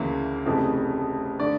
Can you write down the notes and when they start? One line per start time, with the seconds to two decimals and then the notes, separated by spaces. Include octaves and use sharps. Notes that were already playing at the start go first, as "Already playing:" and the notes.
Already playing: D2 C#3 E3 A#3
0.46 F1 F2 C#3 E3 A3
1.39 D3 A3 D5